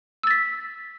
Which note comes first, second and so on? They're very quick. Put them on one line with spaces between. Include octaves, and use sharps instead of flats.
E6 A6 B6